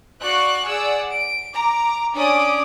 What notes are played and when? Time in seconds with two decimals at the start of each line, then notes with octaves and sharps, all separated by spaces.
0.21 F#4 D5 F5 C#6 F#6
0.64 G#4 D5 F#5 E6
1.11 D7
1.53 A#5 D6
2.14 C#4 D4 D5 D6 D#6